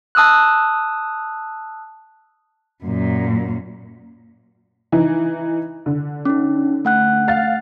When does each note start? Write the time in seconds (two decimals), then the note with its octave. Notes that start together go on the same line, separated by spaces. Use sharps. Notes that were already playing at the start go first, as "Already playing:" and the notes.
0.15 A5 D#6 E6 F#6
2.84 F#2 A#2
4.92 E3 D#4
5.86 D3
6.25 C#4 D#4
6.85 A3 F#5 F#6
7.28 F5 A6